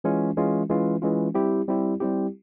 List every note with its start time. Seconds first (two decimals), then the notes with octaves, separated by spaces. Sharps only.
0.04 E3 G#3 C#4 F4
0.37 E3 G#3 C#4 F4
0.70 E3 G#3 C#4 F4
1.02 E3 G#3 C#4 F4
1.34 G3 C4 E4 G4
1.68 G3 C4 E4 G4
2.00 G3 C4 E4 G4